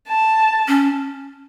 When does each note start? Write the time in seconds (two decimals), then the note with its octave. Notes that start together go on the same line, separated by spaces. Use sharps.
0.08 A5
0.68 C#4